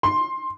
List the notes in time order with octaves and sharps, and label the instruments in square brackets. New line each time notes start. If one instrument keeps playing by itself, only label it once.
[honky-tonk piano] C6